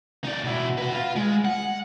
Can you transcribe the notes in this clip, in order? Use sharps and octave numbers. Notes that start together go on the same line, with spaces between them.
D#4 D5
B2 E4
F#4 B4
F4
G#3
F#5